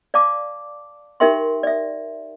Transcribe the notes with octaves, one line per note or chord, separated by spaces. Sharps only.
D5 F5 A5 D6
D#4 G4 A#4 E5 G5 C6
D5 E5